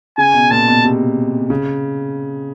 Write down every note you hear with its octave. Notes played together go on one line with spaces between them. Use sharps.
C#3 G#5
B2
A#2 A5
B2
C3
C#3